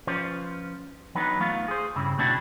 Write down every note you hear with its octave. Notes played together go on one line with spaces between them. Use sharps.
F3 C#4 F4 B4 C5
E3 F#3 B3 D4 D#4 B4
A3 B3 F4 F5
G#4 C5
G2 C#3 G3 C4 E4
B2 A3 C4 D4 E4 F#4